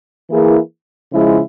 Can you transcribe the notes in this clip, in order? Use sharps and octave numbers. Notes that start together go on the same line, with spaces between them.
E3 A#3 E4 G#4
C#3 F3 G#3 E4